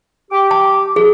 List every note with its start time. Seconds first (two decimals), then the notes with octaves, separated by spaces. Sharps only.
0.31 G4 D6
0.51 A5
0.96 G#4